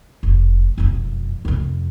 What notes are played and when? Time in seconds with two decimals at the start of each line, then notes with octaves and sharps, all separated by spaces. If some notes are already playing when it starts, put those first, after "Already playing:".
0.23 F1
0.78 E1 F2
1.45 F2 C3